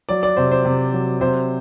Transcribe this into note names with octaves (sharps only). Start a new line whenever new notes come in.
F#3 D5
D5
C3 C5
C5
C3
F#3
C3 C5